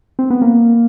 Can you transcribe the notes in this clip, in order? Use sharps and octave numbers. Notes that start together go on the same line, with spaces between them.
C4
B3
A#3